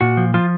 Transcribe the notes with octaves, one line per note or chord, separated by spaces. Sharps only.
A#2 F#4
F3
F3 F4